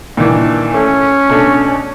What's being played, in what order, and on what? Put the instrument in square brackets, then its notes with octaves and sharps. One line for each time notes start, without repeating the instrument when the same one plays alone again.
[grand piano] A#2 D#3 E3 [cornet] D4
[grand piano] A3 [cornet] C#4
[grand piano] B2 A3 D4